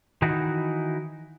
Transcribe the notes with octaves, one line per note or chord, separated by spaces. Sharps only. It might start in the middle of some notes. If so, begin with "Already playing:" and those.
D#3 E3 D#4 E4 F#4